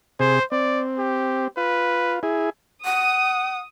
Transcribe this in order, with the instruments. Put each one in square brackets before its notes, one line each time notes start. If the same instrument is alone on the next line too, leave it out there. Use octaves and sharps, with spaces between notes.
[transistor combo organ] C3 G#4 [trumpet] C5
[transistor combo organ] C4 [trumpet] D5
[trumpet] G4
[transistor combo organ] F4 [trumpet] B4
[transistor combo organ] E4 G#4
[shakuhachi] F#5 [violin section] D#6